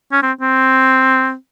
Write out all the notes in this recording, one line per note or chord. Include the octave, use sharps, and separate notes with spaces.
C#4
C4
C4